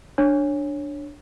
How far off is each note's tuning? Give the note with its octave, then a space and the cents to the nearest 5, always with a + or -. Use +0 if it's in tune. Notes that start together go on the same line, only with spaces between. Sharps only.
D4 +0 C#5 -10